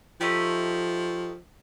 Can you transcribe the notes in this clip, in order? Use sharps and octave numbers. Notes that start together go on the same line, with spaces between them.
F3 A3 D#4 G4